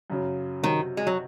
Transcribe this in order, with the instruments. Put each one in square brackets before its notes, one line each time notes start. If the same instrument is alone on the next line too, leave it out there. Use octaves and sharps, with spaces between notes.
[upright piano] F#2 C#3 F#3
[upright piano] C3 F#3 C#4 [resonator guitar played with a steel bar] D#3
[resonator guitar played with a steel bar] G#3
F#3